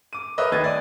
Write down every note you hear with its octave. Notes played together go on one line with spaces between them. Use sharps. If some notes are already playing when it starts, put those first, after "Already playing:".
D6 D#7
A#4 B4 C#5 D#5 E5
D#2 B4 D#5 G#6 A6
D5